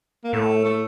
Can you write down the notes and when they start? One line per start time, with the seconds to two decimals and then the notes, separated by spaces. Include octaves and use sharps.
0.24 A#3
0.33 A2 A3
0.65 A3